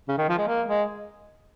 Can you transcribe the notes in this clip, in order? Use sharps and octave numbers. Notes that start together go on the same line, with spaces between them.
C#3
D#3
F3
G#3
A#3
G#3